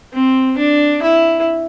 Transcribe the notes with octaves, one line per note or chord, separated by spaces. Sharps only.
C4
D4
E4